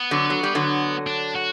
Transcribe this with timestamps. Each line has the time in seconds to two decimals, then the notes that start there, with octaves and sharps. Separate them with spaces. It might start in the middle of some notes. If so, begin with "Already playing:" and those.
Already playing: B3
0.11 D3 F#3
0.30 F#3
0.43 G3
0.55 D3 F#3
1.07 D4
1.35 F#4